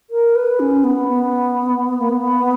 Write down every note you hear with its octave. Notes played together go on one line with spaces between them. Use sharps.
A#4
B4
C#4
B3
B3
A#3
B3